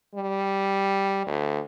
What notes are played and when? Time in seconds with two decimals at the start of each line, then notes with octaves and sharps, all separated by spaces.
0.15 G3
1.27 D2